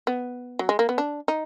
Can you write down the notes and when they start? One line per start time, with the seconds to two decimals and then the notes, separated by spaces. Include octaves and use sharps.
0.07 B3
0.59 F#3
0.69 G#3
0.79 A#3
0.89 B3
0.98 D4
1.28 D#4